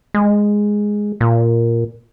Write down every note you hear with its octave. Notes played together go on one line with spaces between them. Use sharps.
G#3
A#2